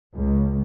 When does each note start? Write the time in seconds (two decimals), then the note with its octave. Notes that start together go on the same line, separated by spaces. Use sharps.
0.14 C#2